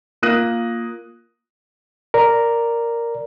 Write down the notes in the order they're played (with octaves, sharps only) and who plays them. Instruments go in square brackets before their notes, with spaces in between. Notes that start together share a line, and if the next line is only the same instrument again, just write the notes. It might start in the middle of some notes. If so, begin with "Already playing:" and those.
[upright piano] A#3 F4 D#6 F#6 A#6 D#7
[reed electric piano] A#4 D5